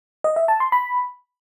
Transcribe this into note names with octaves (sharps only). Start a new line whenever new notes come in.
D#5
E5
A5
C6
B5